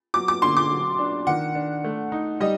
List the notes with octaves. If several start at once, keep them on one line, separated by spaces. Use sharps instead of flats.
F#3 D6
D6
D3 C6
D6
F#3
D4
D#3 F#5
D4
A3
D#4
G3 D#5